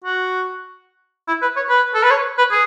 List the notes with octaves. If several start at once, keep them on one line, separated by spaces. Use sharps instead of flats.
F#4
E4
B4
C#5
B4
A4
B4
C#5
B4
G#4